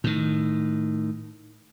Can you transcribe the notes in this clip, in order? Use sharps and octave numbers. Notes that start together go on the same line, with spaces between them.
A2 D#3